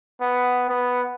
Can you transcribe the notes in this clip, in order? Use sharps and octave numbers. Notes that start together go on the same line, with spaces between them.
B3
B3